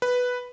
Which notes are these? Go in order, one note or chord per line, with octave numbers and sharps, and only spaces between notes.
B4